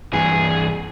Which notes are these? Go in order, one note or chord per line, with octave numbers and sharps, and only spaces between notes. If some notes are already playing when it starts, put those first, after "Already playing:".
G2 E3 G#4